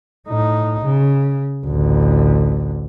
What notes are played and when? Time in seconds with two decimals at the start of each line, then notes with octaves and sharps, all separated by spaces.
0.29 A2 D#4
0.85 C#3
1.66 A1 D2